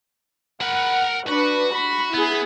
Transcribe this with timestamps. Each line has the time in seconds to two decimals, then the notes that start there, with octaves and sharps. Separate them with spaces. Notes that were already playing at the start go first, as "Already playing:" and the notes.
0.61 A#4 F#5 B5
1.27 D4 F#4 B4
1.72 B5
2.14 B3 E4 G#4